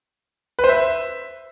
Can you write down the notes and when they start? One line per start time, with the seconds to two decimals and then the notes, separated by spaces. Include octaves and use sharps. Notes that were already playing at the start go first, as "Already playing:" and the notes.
0.59 B4
0.64 C5
0.69 E5